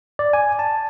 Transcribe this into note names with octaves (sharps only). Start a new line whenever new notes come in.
D5
G#5
A5